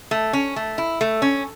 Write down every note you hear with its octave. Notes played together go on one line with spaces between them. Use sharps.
A3
C#4
A3
E4
A3
C#4